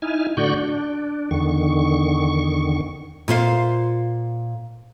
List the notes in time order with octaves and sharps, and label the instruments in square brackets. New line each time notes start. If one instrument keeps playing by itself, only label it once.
[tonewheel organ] D#4 E4 G#5 F6
A2 D3 F#4 D5 C#6 G6
D4
E2 D3 D#3 C#6
[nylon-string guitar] A#2 F4 C5 F5